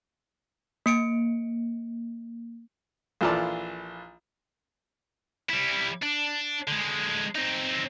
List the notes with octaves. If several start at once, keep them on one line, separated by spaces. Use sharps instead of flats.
A#3 C#7 D7
A#1 E3 F4 A4 D5 A5
G3 E4
D4
D3 G#3
C4 D#4